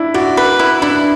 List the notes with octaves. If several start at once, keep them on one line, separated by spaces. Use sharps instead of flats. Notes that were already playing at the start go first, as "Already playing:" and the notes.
Already playing: D4 E4
F#4 D5
B4
E4
D4 E4